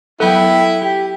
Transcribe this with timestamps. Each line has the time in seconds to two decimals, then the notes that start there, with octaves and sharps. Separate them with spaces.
0.20 F#3 B3 E4 A4 G5
0.82 G4